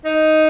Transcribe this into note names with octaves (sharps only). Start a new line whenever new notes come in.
D#4